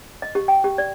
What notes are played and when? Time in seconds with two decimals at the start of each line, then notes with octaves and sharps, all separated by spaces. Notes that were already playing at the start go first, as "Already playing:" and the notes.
0.22 D#5
0.35 G4
0.48 G5
0.64 G4
0.78 D5